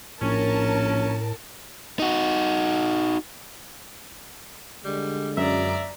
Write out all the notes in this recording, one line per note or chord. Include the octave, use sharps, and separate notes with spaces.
A#1 A2 C#4 A#4 A5
D#4 F#4
D3 G3 G#3
F#2 D5 E5 A#5